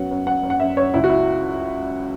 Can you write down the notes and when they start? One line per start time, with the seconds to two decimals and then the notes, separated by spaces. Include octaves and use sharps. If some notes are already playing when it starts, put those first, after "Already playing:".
Already playing: F#2 F#3 B3 F#5
0.11 F#2
0.27 F#2 F#5
0.43 F#2
0.50 F#5
0.60 F#2 E5
0.77 F#2 C#5
0.94 C#2 E4
1.04 F#4
1.10 E4